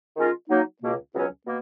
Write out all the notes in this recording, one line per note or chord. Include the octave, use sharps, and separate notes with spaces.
D#3 G#3 C#4 F4 A#4
F#3 A#3 D#4
C#2 B2 A#3
C#2 B2 F#3 C#4
B2 A#3